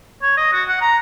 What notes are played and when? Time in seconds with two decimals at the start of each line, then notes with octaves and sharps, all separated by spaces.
0.22 C#5
0.37 D#5
0.52 F#4
0.68 F#5
0.81 A#5